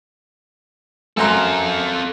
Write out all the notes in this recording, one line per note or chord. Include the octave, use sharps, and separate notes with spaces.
F#2 C4 A4 A#5 C6